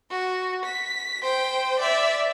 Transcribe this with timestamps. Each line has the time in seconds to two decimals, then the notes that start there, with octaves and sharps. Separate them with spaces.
0.11 F#4
0.65 B6
1.23 C5 G5
1.80 D5 E5